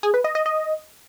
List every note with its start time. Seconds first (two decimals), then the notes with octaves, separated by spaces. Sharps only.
0.03 G#4
0.14 B4
0.24 D#5
0.35 D#5
0.46 D#5